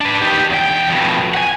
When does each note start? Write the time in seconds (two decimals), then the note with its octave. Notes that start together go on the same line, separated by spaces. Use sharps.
0.01 D4 B4
0.21 D#4 G4
0.50 E2 G5
0.90 F2 B2
1.34 F#5 G#5